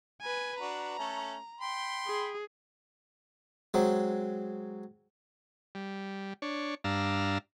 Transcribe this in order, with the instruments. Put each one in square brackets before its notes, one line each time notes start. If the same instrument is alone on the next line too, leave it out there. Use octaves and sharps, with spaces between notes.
[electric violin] B4 G#5
[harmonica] D4 F#4 B4 [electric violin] A#5
[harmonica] A3 C#4 A4
G5 B5 C6
[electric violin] G#4
[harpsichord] F#3 G#3 C4
[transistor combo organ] G3
D4 C#5
G2 D4 F5 A#5 E6